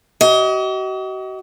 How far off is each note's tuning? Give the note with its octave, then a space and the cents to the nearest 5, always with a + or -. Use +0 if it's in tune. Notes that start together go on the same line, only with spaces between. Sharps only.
F#4 +45 D#5 +30